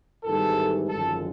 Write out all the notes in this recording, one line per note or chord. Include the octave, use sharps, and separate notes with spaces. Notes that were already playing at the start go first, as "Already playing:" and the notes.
G#1 G#2 E3 G3 A4
G#1 F#2 D3 F3 G#3 A4